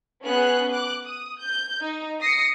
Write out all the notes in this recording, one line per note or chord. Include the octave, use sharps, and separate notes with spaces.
B3 C#4 G#4 F#6
D6 F#6
D#6
G6
D#4
D#6 A#6 C7 C#7